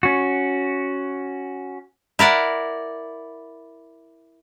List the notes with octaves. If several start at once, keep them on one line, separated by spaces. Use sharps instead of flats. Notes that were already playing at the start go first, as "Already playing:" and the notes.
C#4 F#4
E4 A#4 D5 F#5